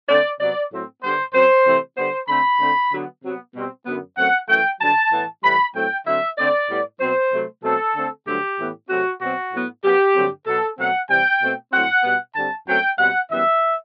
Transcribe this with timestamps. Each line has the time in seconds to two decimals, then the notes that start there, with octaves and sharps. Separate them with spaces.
0.08 D3 A3 C4 D5
0.39 C3 F#3 B3 D5
0.71 A2 F#3 A3 C4
1.02 G2 D3 G3 B3 C5
1.34 F#2 F#3 C4 C5
1.66 C3 E3 A3 C4
1.96 D3 G3 B3 C5
2.28 D3 A3 C4 B5
2.60 D3 A3 C4
2.92 D3 F#3 B3
3.22 C3 F#3 B3
3.54 B2 G3 C4
3.86 F#2 D3 F#3 B3
4.17 F#2 F#3 A3 C4 F#5
4.48 F#2 E3 A3 G5
4.80 G2 D3 F#3 A5
5.11 A2 E3 B3
5.43 A2 E3 G3 B5
5.75 A2 F#3 A3 C4 G5
6.06 D3 F#3 C4 E5
6.38 D3 A3 C4 D5
6.69 A2 G3 B3
7.00 B2 F#3 C4 C5
7.32 C3 F#3 A3
7.63 B2 F#3 A3 C4 A4
7.95 D3 A3 C4
8.26 G2 D3 F#3 A3 C4 G4
8.58 A2 E3 B3
8.89 C3 F#3 A3 C4 F#4
9.21 B2 F#3 C4 F#4
9.53 A2 F#3 B3
9.84 F#2 F#3 B3 G4
10.15 G2 D3 F#3 A3 C4
10.46 B2 F#3 B3 A4
10.78 B2 F#3 A3 C4 F#5
11.10 C3 E3 G3 C4 G5
11.41 B2 A3 C4
11.72 A2 F#3 A3 C4 F#5
12.04 B2 G3 B3
12.35 D3 G3 C4 A5
12.67 F#2 F#3 A3 C4 G5
12.98 B2 G3 C4 F#5
13.30 F#2 E3 G3 B3 E5